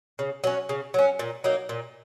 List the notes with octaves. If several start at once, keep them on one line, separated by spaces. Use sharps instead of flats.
C#3
F#3 C#4
C#3
F#3 C#4
A#2
F#3 A#3 D#4
A#2